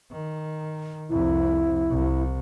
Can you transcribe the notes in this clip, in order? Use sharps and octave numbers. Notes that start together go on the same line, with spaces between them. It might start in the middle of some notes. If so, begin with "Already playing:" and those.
D#3
C2 F2 E4
C2